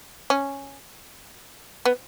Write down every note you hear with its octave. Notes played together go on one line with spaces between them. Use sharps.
C#4
B3